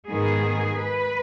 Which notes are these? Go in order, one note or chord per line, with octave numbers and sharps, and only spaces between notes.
G#2 D#3 B3 G#4
B4